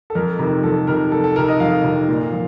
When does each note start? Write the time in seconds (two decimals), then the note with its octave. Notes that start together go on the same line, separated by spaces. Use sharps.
0.10 A4
0.15 F2 A#4
0.39 C3 D#3
0.63 F2 A4
0.87 C3 D#3 A#4
1.12 F2 A4
1.24 A4
1.36 C3 D#3 A#4
1.48 D#5
1.60 F2 F5
1.84 C3 D#3
2.09 A#2
2.33 F3